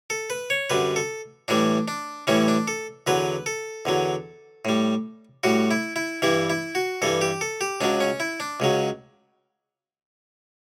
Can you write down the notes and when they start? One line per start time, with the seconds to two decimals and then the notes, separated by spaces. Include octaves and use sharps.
0.10 A4
0.30 B4
0.50 C#5
0.70 F#2 D3 G3 B4
0.96 A4
1.48 A2 E3 G3 D4
1.88 D4
2.27 A2 E3 G3 C#4
2.48 D4
2.68 A4
3.07 E2 D3 F#3 B4
3.46 A4
3.85 E2 D3 F#3
4.65 A2 G3
5.43 A2 G3 F#4
5.71 E4
5.96 E4
6.22 G2 E3 G3 E4
6.50 E4
6.75 F#4
7.02 G2 E3 G3 A4
7.21 G4
7.41 A4
7.61 G4
7.81 C#2 C#3 F#3 D4
8.00 C#4
8.20 E4
8.40 D4
8.60 C#2 C#3 F#3